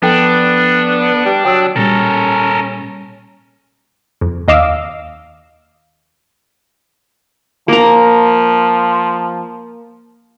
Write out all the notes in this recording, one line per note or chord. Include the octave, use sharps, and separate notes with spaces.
F3 B3 D4 A4 G5
G3
F#3 G5 D#6 E6
A#2 G3 C#4 A4 A#4
F2
D#2 D#5 F5 D6 E6
F3 A#3 A#5